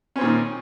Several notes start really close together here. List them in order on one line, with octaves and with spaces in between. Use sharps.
C#4 C4 A#2 D#3